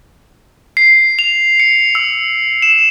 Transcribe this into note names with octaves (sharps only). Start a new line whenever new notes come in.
C7
F7
C#7
E6
E7